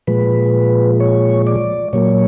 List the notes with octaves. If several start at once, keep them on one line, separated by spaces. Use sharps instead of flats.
A#2 F3 G#3 B4
C#5
D5
A#2 F#3 A#3 C#5